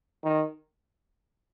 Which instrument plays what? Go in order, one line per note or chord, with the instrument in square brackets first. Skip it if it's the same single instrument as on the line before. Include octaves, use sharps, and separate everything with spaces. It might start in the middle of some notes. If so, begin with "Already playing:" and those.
[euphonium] D#3